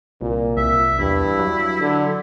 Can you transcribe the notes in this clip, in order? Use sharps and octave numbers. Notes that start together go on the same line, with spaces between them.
C2 A#2
C2 E5
E2 G2 E4
F#3
D3